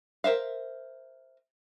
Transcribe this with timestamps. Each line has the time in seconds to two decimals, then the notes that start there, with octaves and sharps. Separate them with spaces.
0.24 A#4 C5 E5 F5